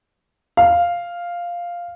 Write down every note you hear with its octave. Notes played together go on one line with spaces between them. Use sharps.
F5